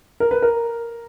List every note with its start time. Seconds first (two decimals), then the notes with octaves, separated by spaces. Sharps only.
0.20 A#4
0.31 B4
0.42 A#4